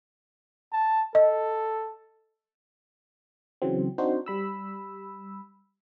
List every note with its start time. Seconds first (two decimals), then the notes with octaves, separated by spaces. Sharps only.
0.72 A5
1.15 A4 D#5
3.62 C#3 E3 F#3 C4
3.98 C4 D4 D#4 F#4 C5
4.26 G3 B5 E6